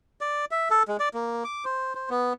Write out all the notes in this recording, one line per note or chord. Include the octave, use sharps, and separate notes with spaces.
D5
E5
A4
G#3
D5
A#3
D6
C5
C5
B3